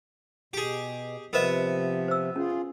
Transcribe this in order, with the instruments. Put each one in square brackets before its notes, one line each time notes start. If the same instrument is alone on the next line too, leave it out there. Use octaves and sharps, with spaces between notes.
[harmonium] B2 [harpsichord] G4 G#4
[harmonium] C3 F3 [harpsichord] B3 E5 [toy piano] A#4 C5 D#5
[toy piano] C5 E6
[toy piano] C#4 [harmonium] F4 G#4